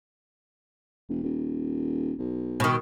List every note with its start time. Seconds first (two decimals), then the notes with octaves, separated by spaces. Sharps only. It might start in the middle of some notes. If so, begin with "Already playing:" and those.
1.09 E1
1.23 D#1
2.18 B1
2.60 B2 D#3